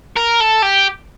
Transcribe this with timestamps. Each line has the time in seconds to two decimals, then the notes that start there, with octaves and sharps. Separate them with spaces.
0.16 A#4
0.40 A4
0.62 G4